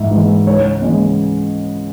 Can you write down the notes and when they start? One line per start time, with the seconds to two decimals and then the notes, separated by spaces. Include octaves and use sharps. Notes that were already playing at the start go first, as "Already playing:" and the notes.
Already playing: G#2 E3 G#3 E5
0.11 E3 G#3
0.46 C#2 C#5
0.82 C#3 E3 G#3